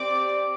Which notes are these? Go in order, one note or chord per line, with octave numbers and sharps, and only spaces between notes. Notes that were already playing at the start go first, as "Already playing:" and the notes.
Already playing: C4 G4 D5 D6